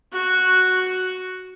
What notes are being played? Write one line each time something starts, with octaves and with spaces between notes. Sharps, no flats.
F#4